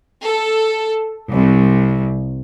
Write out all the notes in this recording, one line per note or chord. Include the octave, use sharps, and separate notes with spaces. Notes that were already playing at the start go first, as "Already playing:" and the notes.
A4
C2